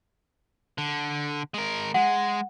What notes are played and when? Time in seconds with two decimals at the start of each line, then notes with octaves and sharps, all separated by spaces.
0.78 D3
1.54 G#3 A#4
1.94 G#3 F#5